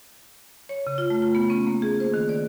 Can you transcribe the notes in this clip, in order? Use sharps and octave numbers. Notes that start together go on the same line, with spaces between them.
C#5
C#3
F4
A3
F4
B3
C#4
A#3
G#4
C5
D#3
D5